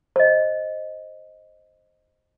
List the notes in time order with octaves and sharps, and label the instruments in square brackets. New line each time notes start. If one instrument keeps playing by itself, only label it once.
[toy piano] C5 D#5